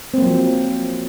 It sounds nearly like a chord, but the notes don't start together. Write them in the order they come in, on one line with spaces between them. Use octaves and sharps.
C4 A#3 F#3 F3